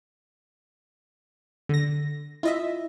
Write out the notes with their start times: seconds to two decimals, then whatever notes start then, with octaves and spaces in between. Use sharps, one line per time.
1.69 D3 A#6
2.43 E4 F4 D#5 E5